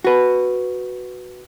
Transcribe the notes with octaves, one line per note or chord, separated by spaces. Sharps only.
F#4 B4